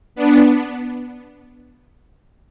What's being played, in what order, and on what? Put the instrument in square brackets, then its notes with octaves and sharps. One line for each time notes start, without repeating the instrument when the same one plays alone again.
[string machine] B3 D4